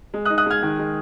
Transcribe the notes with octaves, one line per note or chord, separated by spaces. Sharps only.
G#3
D#6 F#6
D#4
D#6 F#6
G#3 F6 G#6
D#3
G#3